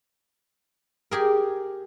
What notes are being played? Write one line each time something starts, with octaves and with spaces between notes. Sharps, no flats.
G4 G#4 A#4